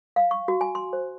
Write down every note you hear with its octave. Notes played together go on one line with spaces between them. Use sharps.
F5
C#6
F#4
G#5
C6
C5